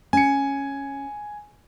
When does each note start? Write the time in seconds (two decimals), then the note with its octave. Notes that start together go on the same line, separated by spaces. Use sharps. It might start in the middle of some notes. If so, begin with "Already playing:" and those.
0.13 C#4 G#5 C#7